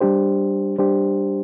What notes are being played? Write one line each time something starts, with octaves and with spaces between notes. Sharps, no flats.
G3 D4 G4 C5
G3 D4 G4 C5